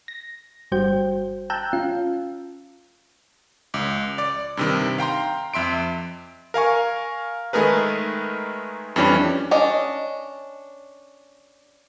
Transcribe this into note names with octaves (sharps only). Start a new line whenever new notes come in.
A#6
G1 G3 F#4 C5 G5 G6
G5 A5 A#5 E6 F#6 G6
C#4 F4 F5
C#2
D5 D6
G2 C3 D#3
F5 G5 A#5 C6
F2 E5 C6 D7
A#4 F5 G#5 C#6
D#3 G#3 A3 G#4 A#4 B4
F2 E3 G3 C#4 D4
C#4 D4 D#5